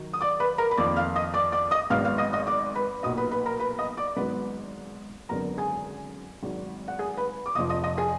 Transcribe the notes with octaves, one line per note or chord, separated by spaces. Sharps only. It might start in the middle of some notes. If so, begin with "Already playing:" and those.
Already playing: D#3 F#3
D#6
D5 D6
B4 B5
A#4 A#5
B5
F2 D#3 A#3 D5 D6
F5 F6
D#5 D#6
D5 D6
D5 D6
D#5 D#6
G#1 G#2 F#3 B3 F5 F6
F5 F6
D#5 D#6
D#5 D#6
D5 D6
B4 B5
B1 A#2 F#3 D#5 D#6
B4 B5
B4 B5
A#4 A#5
B4 B5
D#5 D#6
D5 D6
G#1 G#2 F#3 B3 B4 B5
G#1 F#2 D3 G#3 B3 A#4 A#5
G#4 G#5
G#1 G#2 F#3
F#5
G#4 G#5
B4 B5
D6
F1 F2 F3 D#5 D#6
D#5 D#6
D#5 D#6
G#4 G#5